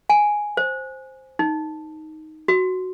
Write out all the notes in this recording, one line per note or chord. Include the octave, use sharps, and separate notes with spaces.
G#5
C5
D#4
F#4